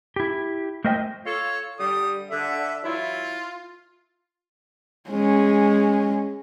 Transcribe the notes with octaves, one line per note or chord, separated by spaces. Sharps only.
E4 G4
A3 A#4 C5 D#5 E5 G5
F4 A4 C#5
D3 G3 D#6
D3 E5
E3 F#3 E4 F4
G#3 C#4